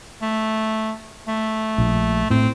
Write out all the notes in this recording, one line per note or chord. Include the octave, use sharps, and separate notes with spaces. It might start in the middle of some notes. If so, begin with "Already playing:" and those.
A3
A3
A#1
A2 C4